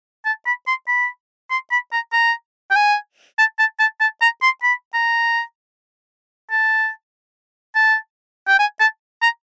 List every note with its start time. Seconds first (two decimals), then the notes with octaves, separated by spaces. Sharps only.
0.25 A5
0.46 B5
0.67 C6
0.88 B5
1.51 C6
1.72 B5
1.93 A#5
2.13 A#5
2.71 G5
2.76 G#5
3.38 A5
3.59 A5
3.80 A5
4.00 A5
4.22 A#5
4.43 C6
4.63 B5
4.94 A#5
6.51 A5
7.76 A5
8.48 G5
8.59 G#5
8.80 A5
9.22 A#5